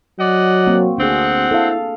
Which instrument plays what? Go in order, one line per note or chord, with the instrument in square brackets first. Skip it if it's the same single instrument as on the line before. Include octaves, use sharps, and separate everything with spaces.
[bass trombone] F#3 [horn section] D5 D#5 F#5
[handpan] A#3 C4 F#4
[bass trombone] D2 [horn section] C4 F#5 [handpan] D4 G#4
[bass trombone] E4 [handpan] A4 F5